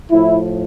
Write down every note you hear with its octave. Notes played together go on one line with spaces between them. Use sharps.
A2 F3 E4